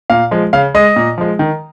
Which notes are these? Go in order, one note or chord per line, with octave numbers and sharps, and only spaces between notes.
A#2 F5
F3 G#3
C#3 F5
G#3 D#5
A#2
F3 G#3
D#3